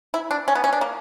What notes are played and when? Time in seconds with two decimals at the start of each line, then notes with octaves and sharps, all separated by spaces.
0.14 E4
0.31 D4
0.48 C#4
0.55 B3
0.64 C#4
0.73 D4
0.81 A#3